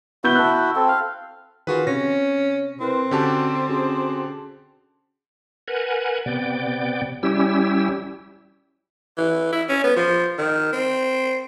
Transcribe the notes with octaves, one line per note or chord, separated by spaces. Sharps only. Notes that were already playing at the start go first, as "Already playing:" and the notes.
B3 E4 F#4 E5 G6 G7
A5 F#6
C4 A4
F5
D#3 F4 F#4 G#4 B4
C3 C#4 A#6
C4 E4 A#4 B4
D3 C#4 F#4 G4 G5 A5
C#4 F#4 G#4
A#4 B4 F#5 G#5
C3 B3 D5 G5
G3 C#4 E4 G4 E6
E3
E4
C#4
B3
F3
D#3
C4